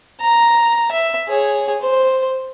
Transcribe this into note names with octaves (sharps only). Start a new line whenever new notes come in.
A#5
E5
G#4 C#5
C5